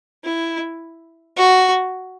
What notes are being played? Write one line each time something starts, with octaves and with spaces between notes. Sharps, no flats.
E4
F#4